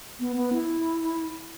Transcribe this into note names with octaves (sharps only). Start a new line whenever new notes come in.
B3
B3
E4